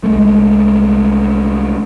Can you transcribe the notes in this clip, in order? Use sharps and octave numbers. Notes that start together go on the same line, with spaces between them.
C2 G#3 A3